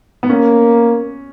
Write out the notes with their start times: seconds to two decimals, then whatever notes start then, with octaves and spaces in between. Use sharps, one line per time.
0.23 B3
0.29 A#3 C#4